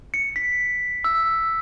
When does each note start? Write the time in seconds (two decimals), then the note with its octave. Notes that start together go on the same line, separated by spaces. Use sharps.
0.14 C#7
0.36 B6
1.04 E6